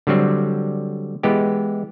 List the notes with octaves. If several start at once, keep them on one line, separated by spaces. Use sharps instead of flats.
D3 F#3 G3 C4
E3 G#3 B3 G4